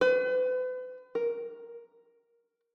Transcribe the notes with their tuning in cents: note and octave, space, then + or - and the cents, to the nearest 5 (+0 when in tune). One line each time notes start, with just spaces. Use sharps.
B4 +40
A#4 +5